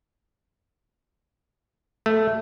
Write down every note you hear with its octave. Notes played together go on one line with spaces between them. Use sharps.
A3